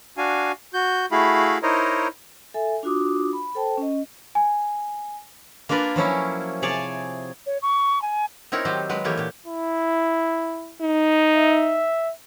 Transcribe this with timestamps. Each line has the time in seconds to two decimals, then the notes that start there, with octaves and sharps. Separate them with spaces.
0.17 D4 F#4 F5 G#5
0.74 F#4 G6
1.11 A3 E4 F#4 G#4 F5 B5
1.62 D#4 E4 A#4 C5 C#5 D#5
2.54 A4 E5 G#5
2.83 D4 F4 F#4 D6 D#6
3.33 B5
3.55 A4 C5 G5 A5
3.77 C#4 D#5
4.35 G#5
5.69 A#3 D4 F4 A#4 B4
5.96 F3 F#3 C#4 E4
6.62 C3 G#4 C#5 D5 G#5 A5
7.46 C#5
7.62 C#6
8.02 G#5
8.52 C4 D#4 E4 A#4 C#5
8.65 D#3 F#3 G4 C5
8.89 F#3 G#3 B4
9.04 E3 A3 A#3 G4 C#5
9.17 A#2 G4
9.46 E4
10.82 D#4
11.36 E5